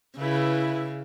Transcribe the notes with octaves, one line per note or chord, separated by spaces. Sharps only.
C#3 E4 B4